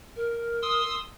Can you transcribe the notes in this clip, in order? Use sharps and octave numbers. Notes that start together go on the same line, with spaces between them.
A#4
C6 D#6 E6